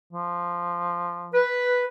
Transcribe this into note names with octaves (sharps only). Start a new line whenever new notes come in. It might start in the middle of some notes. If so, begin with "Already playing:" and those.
F3
B4